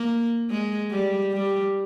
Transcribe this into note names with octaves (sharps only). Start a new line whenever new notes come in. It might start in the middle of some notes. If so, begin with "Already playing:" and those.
Already playing: A#3
G#3
G3
G3